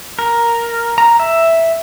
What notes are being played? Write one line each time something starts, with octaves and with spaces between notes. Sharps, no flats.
A#4
A#5
E5